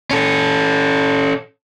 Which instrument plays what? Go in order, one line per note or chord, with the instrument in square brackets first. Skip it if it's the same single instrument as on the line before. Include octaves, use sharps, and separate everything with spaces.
[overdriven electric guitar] C#4 A4